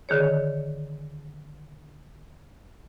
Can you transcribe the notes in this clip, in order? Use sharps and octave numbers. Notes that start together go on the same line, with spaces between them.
D3 D#3 G#4 C#5